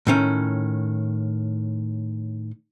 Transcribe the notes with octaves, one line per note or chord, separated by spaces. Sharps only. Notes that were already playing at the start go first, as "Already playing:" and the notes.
A2 D#3 C#4